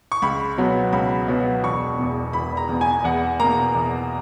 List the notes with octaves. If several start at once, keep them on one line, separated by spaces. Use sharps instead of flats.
C#6
C#2 B5
B2 F#3 B3
C#2 B5
B2 F#3 B3
E1 C#6
E2 B2
E1 B5
A#5
E2 B2
G#5
E2 F#5
B2 A#3 A#5
E2